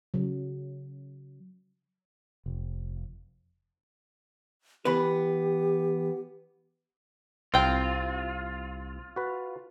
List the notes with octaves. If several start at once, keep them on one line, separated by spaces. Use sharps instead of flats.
C#3 F#3
F1
E3 B3 G4 B4
C2 C4 F4 G5
F#4 B4